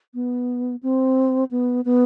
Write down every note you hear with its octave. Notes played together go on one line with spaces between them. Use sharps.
B3
C4
B3
B3